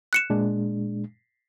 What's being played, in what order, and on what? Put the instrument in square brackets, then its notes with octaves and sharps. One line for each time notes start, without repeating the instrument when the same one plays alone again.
[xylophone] F#6 C#7 E7
[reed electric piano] A#2 G#3 D4